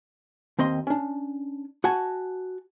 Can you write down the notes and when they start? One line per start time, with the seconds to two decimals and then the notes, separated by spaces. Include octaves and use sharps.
0.59 D#2 C4 D#5 C6
0.87 C#4 D4
1.84 F#4 F#5 G#5 A5